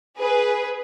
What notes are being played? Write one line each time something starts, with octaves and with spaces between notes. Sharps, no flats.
G#4 B4